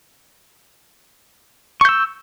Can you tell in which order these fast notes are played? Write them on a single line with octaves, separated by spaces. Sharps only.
C#6 G6 E6